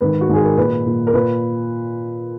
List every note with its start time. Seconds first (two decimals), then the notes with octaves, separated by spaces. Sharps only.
0.01 G#2 D#3 B4
0.21 F#4
0.29 G#2 D#3 G#4
0.45 A#4
0.57 A#2 B4
0.86 A#2
1.07 A#4
1.14 A#2 B4